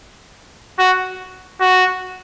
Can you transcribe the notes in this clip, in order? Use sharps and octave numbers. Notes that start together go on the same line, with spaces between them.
F#4
F#4